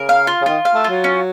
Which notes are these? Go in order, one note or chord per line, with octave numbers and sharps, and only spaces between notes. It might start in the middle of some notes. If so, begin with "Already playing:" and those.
Already playing: C#3 A#4
F5
F4
C#3
D#3 F4
F5
A3
F#3 F4
C#4